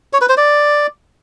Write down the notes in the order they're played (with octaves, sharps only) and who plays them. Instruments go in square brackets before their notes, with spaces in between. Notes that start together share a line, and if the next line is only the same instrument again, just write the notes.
[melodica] C#5
B4
C5
D5